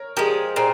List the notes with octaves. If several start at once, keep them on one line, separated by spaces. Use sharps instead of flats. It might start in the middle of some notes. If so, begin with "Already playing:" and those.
Already playing: A#4 C#5
F3 G#3 G4 A#4
A#2 G#4 C5